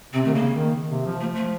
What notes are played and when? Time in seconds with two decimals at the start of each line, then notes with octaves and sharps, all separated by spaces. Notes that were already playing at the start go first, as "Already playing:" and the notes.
0.13 C3 C4
0.25 D#3 A3
0.35 C#3 A#3
0.56 D#3
0.91 C3
1.06 F3
1.20 F3 A3
1.35 A3